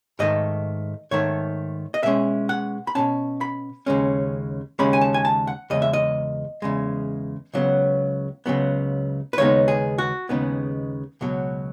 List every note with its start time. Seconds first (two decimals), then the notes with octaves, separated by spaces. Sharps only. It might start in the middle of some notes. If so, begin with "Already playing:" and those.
0.19 G#2 D#3 A3 D#5
1.11 G#2 D#3 A3 C#5
1.94 D#5
2.03 B2 G#3 C#4 E5
2.49 F#5
2.87 B5
2.95 B2 G#3 C#4 A5
3.41 B5
3.86 D#2 C#3 G#3 C#4
4.79 D#2 C#3 G#3 C#4 B5
4.93 G#5
5.01 A5
5.14 G#5
5.25 A5
5.47 F#5
5.70 E2 C#3 G#3 D#5
5.82 E5
5.93 D#5
6.62 E2 C#3 G#3
7.54 C#2 C#3 F#3 B3
8.46 C#2 C#3 F#3 B3
9.33 B4
9.37 D#2 C#3 G#3 B3 D#4 C#5
9.68 G#4
9.98 F#4
10.29 D#2 C#3 G#3 B3 D#4
11.21 C#2 B2 F#3